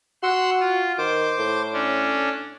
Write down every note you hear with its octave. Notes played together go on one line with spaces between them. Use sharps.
F#4 F#5 C6 E6
F4
D#3 C5 D6
A2
C#4 D4